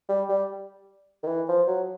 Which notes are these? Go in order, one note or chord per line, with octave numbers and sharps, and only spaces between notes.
G3
G3
D#3
E3
F3
F#3